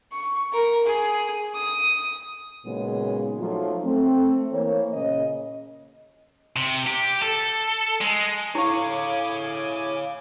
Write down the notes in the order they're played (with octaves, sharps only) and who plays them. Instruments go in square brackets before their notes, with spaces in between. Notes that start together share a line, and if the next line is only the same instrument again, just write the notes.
[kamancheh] C#6
A#4
G#4
D#6
[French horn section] A#2 C#3 F#3 G#3 B3 D#4
F3 F#3 A3 D#4 F4
A3 C4
E3 A#3 C5 C#5
A#2 C#3 C#4 D#5
[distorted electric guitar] C3
G4
A4
G#3
[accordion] A2 G#5 D6 [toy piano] E4 C#6 [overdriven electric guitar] C#5 F5